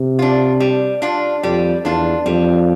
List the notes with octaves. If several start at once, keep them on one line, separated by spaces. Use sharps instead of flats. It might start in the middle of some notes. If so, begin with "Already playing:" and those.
Already playing: C3
D4 F4
G3
D4 F4
F2 G3
E2 D4 F4
F2 G3